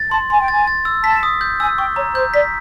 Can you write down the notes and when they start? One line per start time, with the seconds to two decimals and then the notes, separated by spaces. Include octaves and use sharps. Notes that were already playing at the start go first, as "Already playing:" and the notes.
Already playing: A6
0.11 A5 C6
0.30 G#5 C6
0.40 G5
0.48 G#5 A6
0.67 A6
0.85 E6
1.04 A5 B6
1.23 D#6
1.41 G6
1.60 G#5 E6
1.78 G5 C#6
1.96 C#5 A#5
2.15 C5 G6
2.33 D5 B6